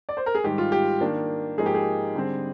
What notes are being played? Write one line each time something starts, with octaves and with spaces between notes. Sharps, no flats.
D5
C5
A#4
G#4
G#2 D#3 G3 G4
F4
G4
D#3 A#3 D4
G#2 F3 A#3 D#4 G#4
G4
G#4
D3 G3 C4